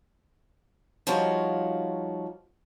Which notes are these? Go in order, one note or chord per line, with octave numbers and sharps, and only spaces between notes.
F3 G3 D#4 F4 F#4 C#5